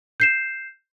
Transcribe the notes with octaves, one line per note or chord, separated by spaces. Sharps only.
G6 C7 E7